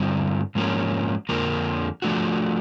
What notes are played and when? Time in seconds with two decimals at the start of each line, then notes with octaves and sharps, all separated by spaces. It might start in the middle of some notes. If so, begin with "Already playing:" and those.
Already playing: G2 D3 G3 C4 E4
0.55 G#2 F3 A#3 C#4
1.29 F2 D3 F3 A#3
2.02 F3 A3 D4 F#4